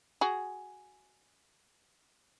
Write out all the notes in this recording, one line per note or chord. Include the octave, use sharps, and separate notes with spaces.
F#4 G#4